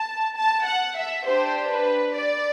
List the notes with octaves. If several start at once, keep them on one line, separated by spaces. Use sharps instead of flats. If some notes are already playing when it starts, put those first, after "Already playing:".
Already playing: A5
A5
F#5
E5
D4 G4 C5
B4
D5